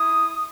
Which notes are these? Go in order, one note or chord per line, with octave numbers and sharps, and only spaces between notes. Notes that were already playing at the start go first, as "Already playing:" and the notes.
Already playing: E4 D#6